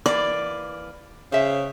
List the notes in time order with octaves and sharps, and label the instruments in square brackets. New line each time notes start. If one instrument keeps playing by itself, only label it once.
[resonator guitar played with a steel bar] E3 A#3 [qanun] D5
[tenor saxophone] C#3 [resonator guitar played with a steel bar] C5 E5